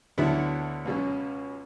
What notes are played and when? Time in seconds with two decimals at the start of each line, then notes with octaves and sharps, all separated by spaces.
0.18 D2 D3 F#3 B3 E4
0.85 C#2 B2 F#3 C#4